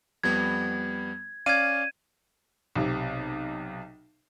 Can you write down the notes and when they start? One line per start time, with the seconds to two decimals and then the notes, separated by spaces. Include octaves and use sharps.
0.24 F2 G3 B3 G#6
1.46 C#4 D5 F5 G#6 D#7
2.75 B1 C3